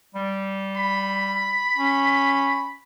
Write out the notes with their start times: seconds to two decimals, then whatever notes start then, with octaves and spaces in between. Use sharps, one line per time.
0.15 G3
0.77 B5
1.77 C#4